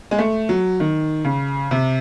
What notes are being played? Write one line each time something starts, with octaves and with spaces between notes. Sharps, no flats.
G#3
A3
F#3
D#3
C#3
C3